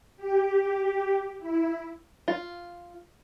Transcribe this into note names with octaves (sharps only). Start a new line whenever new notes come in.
G4
E4
F4